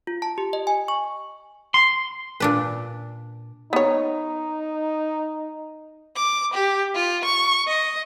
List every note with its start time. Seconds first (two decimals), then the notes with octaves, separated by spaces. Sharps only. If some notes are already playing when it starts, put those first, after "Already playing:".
0.07 F4
0.22 A5
0.38 G4
0.53 D#5
0.67 G#5
0.88 C#6
1.74 C6
2.40 A#2 D4 B4
3.73 B3 D#4 C#5
6.16 D6
6.54 G4
6.95 F4
7.25 C#6
7.67 D#5